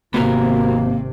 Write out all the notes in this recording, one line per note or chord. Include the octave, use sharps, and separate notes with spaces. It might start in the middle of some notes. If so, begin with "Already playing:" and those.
G#1 C3 A#3 B3 F#4 A#4